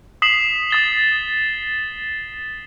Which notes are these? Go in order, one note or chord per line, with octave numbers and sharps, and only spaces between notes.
D#6 B6 C7 E7 F#7
D#6 A6 G7